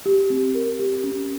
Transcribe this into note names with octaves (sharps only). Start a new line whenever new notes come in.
G4
C4
A#4
G4
C#4